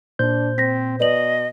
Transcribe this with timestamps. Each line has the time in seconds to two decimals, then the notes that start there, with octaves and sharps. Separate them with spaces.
0.19 A#2 D4 C5 G6
0.58 C4 A#6 B6
1.00 B2 B4 D5 D#5 F#7